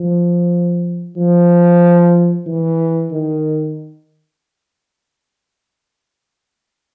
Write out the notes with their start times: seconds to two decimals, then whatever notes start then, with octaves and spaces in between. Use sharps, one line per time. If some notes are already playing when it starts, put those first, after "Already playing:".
Already playing: F3
1.17 F3
2.47 E3
3.12 D#3